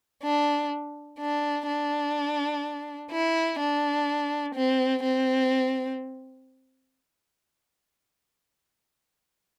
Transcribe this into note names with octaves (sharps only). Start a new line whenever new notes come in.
D4
D4
D4
E4
D4
C4
C4